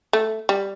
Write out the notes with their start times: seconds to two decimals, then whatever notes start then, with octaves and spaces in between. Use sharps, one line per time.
0.13 A3
0.49 G3